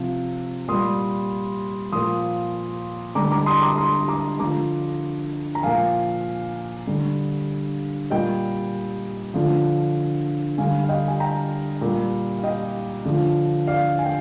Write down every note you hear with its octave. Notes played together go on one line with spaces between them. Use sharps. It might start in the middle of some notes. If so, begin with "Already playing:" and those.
Already playing: C3 F3
A#2 G3 C6 D#6
A#2 F3 C6 D#6
D3 G3 A#5 D6
A#5 D6
C6 D#6
A#5 D6
C6 D#6
A#5 D6
D3 F3 A#5 D6
A#5
A#2 F3 F5 G#5
D3 G3
A#2 G3 D#5 G5
D3 F3
D3 G3 F5 G#5
F5
D#5 G5
G#5
G5 A#5
A#2 G3
F5
D#5 G5
D3 F3
D5 F5
G#5
G5